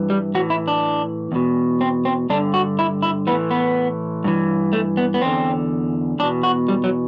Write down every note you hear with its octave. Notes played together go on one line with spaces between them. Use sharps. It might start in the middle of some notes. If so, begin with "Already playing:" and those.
Already playing: G2 E3
G3
A2 E3 F#4
E4
D4
E2 B2
C4
C4
G2 D3 D4
F#4
E4
E4
A2 E3 B3
B3
G2 E3
A3
B3
B3
E2 D3 C4
E2 B2 D4
F#4
G3
F#3